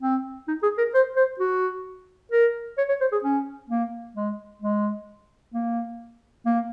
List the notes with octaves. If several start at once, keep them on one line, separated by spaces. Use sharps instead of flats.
C4
D#4
G#4
A#4
C5
C5
F#4
A#4
C#5
C#5
C5
G#4
C#4
A#3
G#3
G#3
A#3
A#3